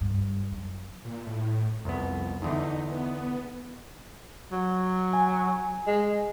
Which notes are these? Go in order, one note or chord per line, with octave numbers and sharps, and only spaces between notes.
G2
F#2
A#2
A2
C2 F2 B3
E2 D3 E3 D#4
B3
F#3
G#5
G#3